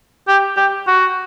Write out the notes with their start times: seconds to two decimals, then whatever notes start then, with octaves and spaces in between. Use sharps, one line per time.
0.28 G4
0.57 G4
0.87 F#4